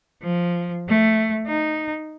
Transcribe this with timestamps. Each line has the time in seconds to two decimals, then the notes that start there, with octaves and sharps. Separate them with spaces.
0.22 F3
0.88 A3
1.47 D#4